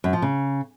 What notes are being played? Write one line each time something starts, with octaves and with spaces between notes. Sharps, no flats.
F#2
F3
C#3